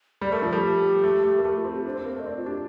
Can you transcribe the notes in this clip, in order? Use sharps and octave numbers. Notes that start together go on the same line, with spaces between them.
G3 D5
A3 A#4
F3 A4
G3 G4
A3
A3
A#3
A3 G4
F4
C4
G4
D4 C5
C4
A#3
A3
D#5
C4 D5
F4
D4 G4